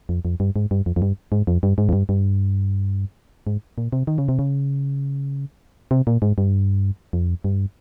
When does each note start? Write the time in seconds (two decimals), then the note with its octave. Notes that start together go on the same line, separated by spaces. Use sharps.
0.09 F2
0.25 F2
0.40 G2
0.56 G#2
0.71 G2
0.86 F2
0.96 F2
1.02 G2
1.32 G#2
1.47 F2
1.63 G2
1.78 G#2
1.89 F2
1.93 G2
2.09 G2
3.47 G#2
3.78 A#2
3.93 C3
4.07 D#3
4.18 C#3
4.29 C3
4.39 C#3
5.91 C3
6.07 A#2
6.22 G#2
6.38 G2
7.13 F2
7.44 G2